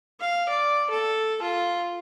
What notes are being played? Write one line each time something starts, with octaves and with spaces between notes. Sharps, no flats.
F5
D5
A4
F4